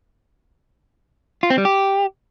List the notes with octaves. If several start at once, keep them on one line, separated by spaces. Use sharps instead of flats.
F4
C4
G3
G4